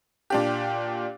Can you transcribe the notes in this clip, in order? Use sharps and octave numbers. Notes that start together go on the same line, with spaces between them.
A#2 D4 G4